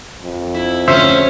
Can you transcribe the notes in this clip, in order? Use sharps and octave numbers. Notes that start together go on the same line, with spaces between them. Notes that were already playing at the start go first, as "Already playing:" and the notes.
F2
E4
D2 C#4 C5 E5